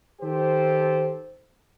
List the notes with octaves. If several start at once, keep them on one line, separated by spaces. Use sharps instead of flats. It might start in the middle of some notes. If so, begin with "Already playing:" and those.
D#3 G4 A4 C5